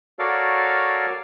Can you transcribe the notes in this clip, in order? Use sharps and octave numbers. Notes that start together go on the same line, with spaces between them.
F#4 A4 A#4 C#5 D5 F5